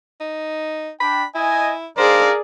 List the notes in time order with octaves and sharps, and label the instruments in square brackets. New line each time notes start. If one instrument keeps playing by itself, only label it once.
[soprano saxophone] D#4
[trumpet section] D4 G5 [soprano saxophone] B5
[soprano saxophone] E4 [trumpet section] D#5 G#5
[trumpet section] D4 D#4 F5 [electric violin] G#4 D5 [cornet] A#4 [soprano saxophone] C5